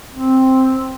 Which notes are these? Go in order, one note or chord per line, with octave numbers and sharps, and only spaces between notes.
C4